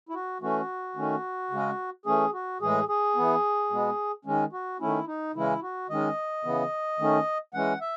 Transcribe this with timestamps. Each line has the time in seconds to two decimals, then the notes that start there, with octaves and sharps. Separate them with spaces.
0.09 E4
0.14 F#4
0.42 E3 A3 C#4 F#4
0.96 D#3 A3 C#4
1.51 C#3 G#3 C#4
2.06 E3 A3 C#4 G#4
2.33 F#4
2.61 A2 E3 G#3 G#4
2.88 G#4
3.16 E3 B3
3.70 B2 G#3 B3
4.25 D#3 G#3 C#4
4.53 F#4
4.80 D#3 A3 C#4 E4
5.07 D#4
5.35 C#3 E3 G#3 C#4 E4
5.62 F#4
5.90 D#3 G#3 C#4 D#5
6.45 C#3 E3 B3
6.99 D#3 A3 C#4
7.54 E3 G#3 C#4 F#5
7.81 E5